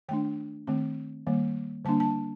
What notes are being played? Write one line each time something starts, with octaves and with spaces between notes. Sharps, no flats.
D#3 A3 D4 G5
D#3 A3 C4
D#3 G3 A#3
D3 G3 A#3 D4 A5
A5